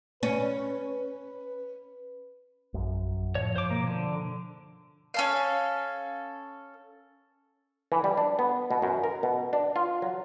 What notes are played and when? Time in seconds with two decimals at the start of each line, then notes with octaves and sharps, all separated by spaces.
0.23 C#4 B4
2.74 A#1 F#2
3.35 A2 F3 C#5
3.56 G2 C5 D6
3.71 B2 A#3
3.87 D3
5.14 C#4 A4 F5
7.92 E3
8.04 G3
8.18 D4
8.39 B3
8.71 B2
8.82 F#2
9.04 A#4
9.23 B2
9.53 D4
9.76 F4
10.02 F#3